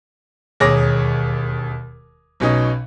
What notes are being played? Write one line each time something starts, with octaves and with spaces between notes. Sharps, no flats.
E1 D#2 G#4 C#5 D6 A#6
B1 B2 C#4 D#4